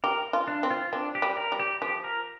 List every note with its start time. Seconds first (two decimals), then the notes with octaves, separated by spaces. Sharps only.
0.04 G4 A#4
0.33 F4
0.48 D4
0.63 C4
0.70 F4
0.92 C4 D4
1.15 G4
1.22 G3
1.37 A#4
1.52 G3
1.59 G4
1.82 F3 G4
2.04 A#4